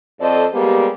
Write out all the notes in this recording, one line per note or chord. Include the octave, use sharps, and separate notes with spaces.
F2 C4 A4 C5 D5 D#5
G3 G#3 A#3 B3 G4